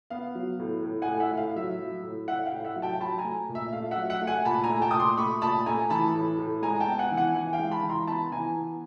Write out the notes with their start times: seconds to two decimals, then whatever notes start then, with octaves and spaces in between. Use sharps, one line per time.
0.10 B3 F5
0.35 F#3
0.60 A2
0.83 A2
1.02 F#5 G#5
1.07 A2
1.20 E5 F#5
1.32 A2
1.37 F5
1.56 F#3 E5
1.80 F#3
2.04 A2
2.28 A2 E5 F#5
2.46 F5 G5
2.53 A2
2.65 E5 F#5
2.76 F#3
2.82 G5 A5
3.00 F#3 A5 B5
3.18 G#5 A#5
3.24 A3
3.49 A#2
3.55 E5
3.73 A3 F5
3.91 E5 F#5
3.97 F#3
4.10 E5 F#5
4.21 A3
4.27 F#5 G#5
4.45 A#2 A5 B5
4.64 G#5 A#5
4.70 A3
4.82 G5 A5
4.91 A#2 D#6
5.00 C6 D6
5.17 A3 B5 C#6
5.42 A#2 A5 B5
5.66 A3 G#5 A#5
5.90 E3 A5 B5
6.14 A2
6.39 A2
6.62 G#3 G#5 A#5
6.80 G5 A5
6.87 B3
6.98 F#5 G#5
7.12 E3
7.17 F#5 G#5
7.35 E3 F#5 G#5
7.53 F5 G5
7.59 G#3
7.71 A5 B5
7.83 E3
7.89 A#5 C6
8.07 B3 A5 B5
8.32 E3 G#5 A#5
8.56 B3